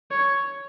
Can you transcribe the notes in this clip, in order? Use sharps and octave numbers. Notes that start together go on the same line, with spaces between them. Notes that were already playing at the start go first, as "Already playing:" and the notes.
C#5